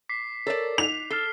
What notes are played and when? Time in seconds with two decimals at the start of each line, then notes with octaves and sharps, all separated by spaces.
0.09 D6 B6 C7
0.47 A4 A#4 C#5 D5
0.78 D#4 F7
1.10 A4 F6 C7 G7